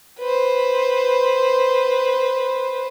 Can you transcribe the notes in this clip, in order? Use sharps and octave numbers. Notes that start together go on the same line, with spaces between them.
B4 C5